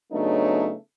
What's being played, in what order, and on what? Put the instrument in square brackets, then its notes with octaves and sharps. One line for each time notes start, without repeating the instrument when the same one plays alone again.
[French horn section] C#3 F#3 A3 B3 D4 D#4